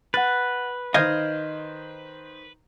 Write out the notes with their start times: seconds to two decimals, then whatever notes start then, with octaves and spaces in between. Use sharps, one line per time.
0.14 B4 F#5 F#6 A6
0.94 D#3 C5 D#5 F5 F6 G6 G#6